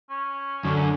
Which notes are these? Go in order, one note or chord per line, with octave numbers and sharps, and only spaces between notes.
C#4
F#2 D3